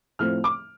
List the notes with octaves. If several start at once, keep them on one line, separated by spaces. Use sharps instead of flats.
A2 F3 A3 C4 F6
D6